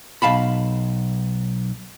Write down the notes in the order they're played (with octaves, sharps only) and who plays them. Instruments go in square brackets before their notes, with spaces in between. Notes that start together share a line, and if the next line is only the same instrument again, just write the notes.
[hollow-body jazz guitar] B1 F5 A5 B5